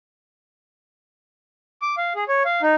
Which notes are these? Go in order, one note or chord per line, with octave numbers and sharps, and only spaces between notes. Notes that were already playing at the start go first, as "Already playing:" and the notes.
D6
F5
G#4
C#5
F5
D#4